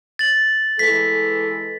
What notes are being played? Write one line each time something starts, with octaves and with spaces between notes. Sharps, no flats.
A6 F#7
E3 G#3 A4 B6